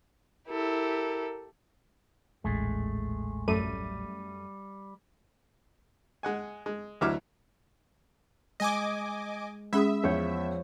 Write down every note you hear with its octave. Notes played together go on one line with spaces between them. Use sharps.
E4 G4 A4 A#4
D#1 A1 G#3 A3
F#2 G3 A3 D#7
G#3 F#5 G#5
G#3
D2 E3 F#3 E5 D6 F6
G#3 D#5 G#5 D6
G#3 C#4 G#4 E5 B5 D#6
E2 F3 C#5 G6